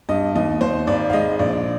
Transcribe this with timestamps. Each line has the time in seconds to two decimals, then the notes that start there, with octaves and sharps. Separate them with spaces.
0.09 G2 D#5
0.36 D#2 D#5
0.61 D#2 C5
0.87 G#1 D5
1.10 F5
1.13 G#3 D#5
1.39 A#1 D5